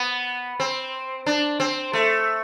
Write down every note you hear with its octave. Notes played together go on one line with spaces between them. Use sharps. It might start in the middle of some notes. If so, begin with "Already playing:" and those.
Already playing: B3
C4
D4
C4
A3